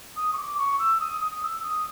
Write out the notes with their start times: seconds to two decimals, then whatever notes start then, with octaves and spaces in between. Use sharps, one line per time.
0.16 D#6
0.33 C#6
0.37 D6
0.58 C#6
0.79 E6
1.00 D#6
1.21 D#6
1.43 E6
1.64 D#6